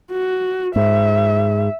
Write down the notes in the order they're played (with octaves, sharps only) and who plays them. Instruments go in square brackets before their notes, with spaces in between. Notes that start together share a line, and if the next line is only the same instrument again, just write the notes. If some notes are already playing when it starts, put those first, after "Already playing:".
[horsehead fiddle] F#4
[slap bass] G#2 [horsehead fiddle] E5